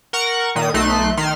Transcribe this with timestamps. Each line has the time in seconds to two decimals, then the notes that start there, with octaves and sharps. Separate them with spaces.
0.13 A#4 F#5 C#6
0.55 A#2 D#3 D#6
0.74 B1 A3 D#4 C6 F#6
1.17 D#3 C6 F6